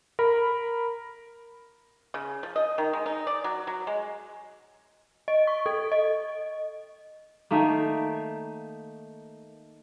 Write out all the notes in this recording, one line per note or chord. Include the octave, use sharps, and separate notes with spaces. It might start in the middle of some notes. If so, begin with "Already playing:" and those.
A#4 B5
C#3
F3
D#5
D#3
G#3
D#4
D5
F#3
F#3
G#3
D#5
C#6
A4
D#5
D#3 A3 A#3